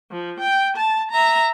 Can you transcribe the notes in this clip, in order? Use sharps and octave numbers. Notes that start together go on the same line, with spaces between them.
F3
G5
A5
E5 A#5